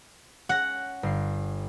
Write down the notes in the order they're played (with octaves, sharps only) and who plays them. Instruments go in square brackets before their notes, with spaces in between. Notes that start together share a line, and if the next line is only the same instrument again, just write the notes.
[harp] C#4 A#6 [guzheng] F#5
[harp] G1 C7